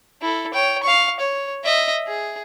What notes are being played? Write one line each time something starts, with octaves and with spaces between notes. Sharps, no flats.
E4 A4
C#5 G5
F5 C#6
C#5
D#5 E5
G#4